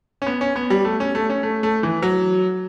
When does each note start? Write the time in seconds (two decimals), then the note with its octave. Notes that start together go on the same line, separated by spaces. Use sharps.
0.22 C#4
0.26 B3
0.41 C#4
0.56 B3
0.70 G3
0.85 A3
1.00 C#4
1.15 A3
1.30 C#4
1.43 A3
1.63 A3
1.83 E3
2.02 F#3